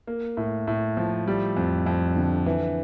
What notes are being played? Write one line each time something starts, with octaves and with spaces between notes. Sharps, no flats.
A#3
A2
A2
F3
G3
F2
F2
D3
E3